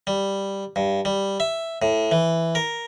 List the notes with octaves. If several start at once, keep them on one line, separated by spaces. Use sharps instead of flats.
G3
G2
G3
E5
A2
E3
A#4